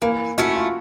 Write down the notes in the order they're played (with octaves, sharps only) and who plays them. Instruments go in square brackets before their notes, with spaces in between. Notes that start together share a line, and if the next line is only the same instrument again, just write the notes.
[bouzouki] E3 [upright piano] A#3
[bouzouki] A3 C#4 E4 [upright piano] F#4
[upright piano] F4